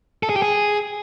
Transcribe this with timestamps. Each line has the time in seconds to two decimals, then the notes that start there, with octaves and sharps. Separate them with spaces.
0.23 A4
0.30 G#4
0.36 G4
0.42 G#4